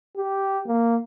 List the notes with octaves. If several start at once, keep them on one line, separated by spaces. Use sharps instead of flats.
G4
A#3